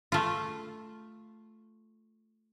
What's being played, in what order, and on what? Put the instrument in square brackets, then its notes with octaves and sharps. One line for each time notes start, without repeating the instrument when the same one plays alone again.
[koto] A3 F4